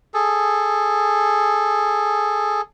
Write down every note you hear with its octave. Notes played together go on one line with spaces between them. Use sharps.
G#4 A4